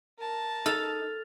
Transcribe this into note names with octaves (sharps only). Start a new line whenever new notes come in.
A#4 A5
D#4 A4 F6 A6 F7